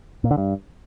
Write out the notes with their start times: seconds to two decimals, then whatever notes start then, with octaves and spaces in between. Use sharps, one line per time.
0.24 A#2
0.31 D3
0.38 G2